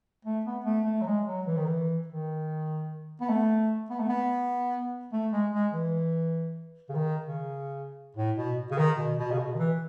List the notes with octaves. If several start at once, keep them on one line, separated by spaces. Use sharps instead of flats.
A3
B3
A3
A3
F#3
G#3
F#3
E3
D#3
E3
D#3
B3
A3
B3
A3
B3
A3
G#3
G#3
E3
C#3
D#3
C#3
A2
B2
C#3
D#3
B2
B2
C#3
B2
D#3
E3